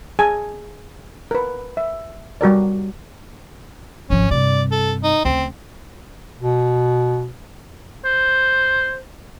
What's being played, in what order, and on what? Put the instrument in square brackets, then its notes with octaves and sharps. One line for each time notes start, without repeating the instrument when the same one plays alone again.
[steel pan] G#4 G#5 A5
A#4 B4
E5
G3 F#4 A#4 D5
[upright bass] G#1 F3 [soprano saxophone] C#4
[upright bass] G2 C3 [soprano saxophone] D5
[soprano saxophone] A4
D#4
[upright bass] D2 C#3 [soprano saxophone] C4
[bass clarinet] B2
[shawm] C5